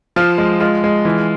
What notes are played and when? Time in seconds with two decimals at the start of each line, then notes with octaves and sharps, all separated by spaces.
0.16 F3 F4
0.38 G#3
0.60 G#3 F4
0.84 G#3
1.05 E3